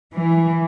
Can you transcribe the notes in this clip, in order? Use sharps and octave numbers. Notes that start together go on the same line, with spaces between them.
E3